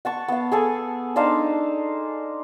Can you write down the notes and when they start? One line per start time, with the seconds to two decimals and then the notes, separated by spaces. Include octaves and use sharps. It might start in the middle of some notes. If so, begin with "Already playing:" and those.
0.05 F#5 A5 C#6
0.28 B3 F5
0.52 G#4 A4 G#5
1.16 D4 D#4 C5 F5